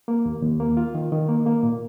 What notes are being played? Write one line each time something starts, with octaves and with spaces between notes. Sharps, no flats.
A#3
D#2
D#2
A#3
F4
D#3
D#3
A#3
A#3
A#2